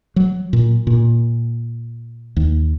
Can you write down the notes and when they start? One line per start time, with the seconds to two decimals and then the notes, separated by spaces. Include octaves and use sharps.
0.16 F#3
0.53 A#2
0.87 A#2
2.36 D#2